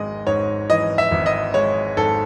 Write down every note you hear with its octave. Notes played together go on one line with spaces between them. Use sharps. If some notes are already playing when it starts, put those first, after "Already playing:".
Already playing: G#1 G#3 D#5
G#2 C#5
E3 D#5
E5
G#1
D#5
G#3 C#5
G#2 A4